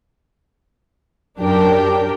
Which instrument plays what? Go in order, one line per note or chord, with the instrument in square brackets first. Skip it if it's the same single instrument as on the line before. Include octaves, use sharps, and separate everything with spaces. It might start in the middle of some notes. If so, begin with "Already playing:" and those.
[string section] F#2 D4 G4 A#4 G5